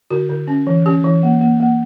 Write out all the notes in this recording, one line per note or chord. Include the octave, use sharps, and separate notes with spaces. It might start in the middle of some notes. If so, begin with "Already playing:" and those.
D3 F#4
D3
C#4
E3
C#4 G4
E3
A#3
A#3
A#3